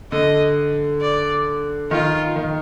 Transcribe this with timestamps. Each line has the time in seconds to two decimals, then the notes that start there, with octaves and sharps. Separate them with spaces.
0.12 D3 D#5
1.01 D5
1.91 D#3 F4
2.36 D#3